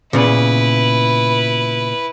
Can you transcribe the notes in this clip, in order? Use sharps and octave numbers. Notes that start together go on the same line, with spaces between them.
A#2 C#3 B3 E4 B4